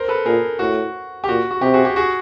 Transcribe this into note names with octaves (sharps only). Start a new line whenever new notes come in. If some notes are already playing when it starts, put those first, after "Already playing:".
Already playing: A#4 C5
A4 B4
A#2 G#4 A#4
A2 F#4
G4
A#2 F#4
F#4
C3 G4
F#4 G#4
G4
F#4 G#4